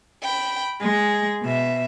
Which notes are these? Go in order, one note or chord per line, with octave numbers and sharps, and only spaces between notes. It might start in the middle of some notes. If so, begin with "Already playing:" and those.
G5 B5
G#3 G#4
B2 E5